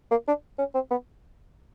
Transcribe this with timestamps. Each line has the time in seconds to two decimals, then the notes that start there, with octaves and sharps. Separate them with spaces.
0.11 A#3
0.28 D4
0.59 C#4
0.74 C4
0.91 B3